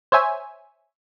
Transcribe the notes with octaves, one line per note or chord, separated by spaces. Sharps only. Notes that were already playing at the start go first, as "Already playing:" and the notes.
C5 C#5 E5 G#5